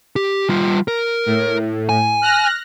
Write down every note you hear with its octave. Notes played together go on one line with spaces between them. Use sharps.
G4
G3 F4
A#4
A2
G#5
F6 F#6 A#6